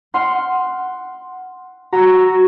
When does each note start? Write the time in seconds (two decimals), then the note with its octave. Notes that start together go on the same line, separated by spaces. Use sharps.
0.14 F#5 C6 F6
1.93 F#4 A#5 E6